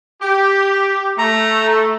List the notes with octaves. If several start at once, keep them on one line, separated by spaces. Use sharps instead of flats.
G4
A3 A#5